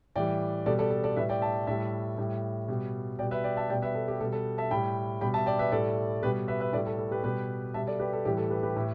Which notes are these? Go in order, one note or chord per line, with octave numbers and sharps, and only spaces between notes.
A2 E3 G3 D5 G5
B2 G3 A4 D5
A4 D5
A4
A4 D5
A2 G3 B4 E5
D5 G5
E5 A5
A2 G3 E5 A5
A2 G3
B2 G3
B2 G3 D5 G5
B4 E5
D5 G5
E5 A5
B2 G3 D5 G5
B4 E5
A4
G4
B2 G3 A4
A4
E5 A5
A2 G3 G5 B5
B2 G3 G5 B5
E5 A5
D5 G5
B4 E5
A2 G3 A4 D5
B2 G3 G4 B4
B4 E5
B4 E5
A2 G3 A4 D5
A4
A4
G4 B4
B2 G3 G4 B4
B2 G3 E5 A5
A4 D5
G4 B4
A4
A2 E3 G3 G4
A4
G4 B4
G4 B4
A2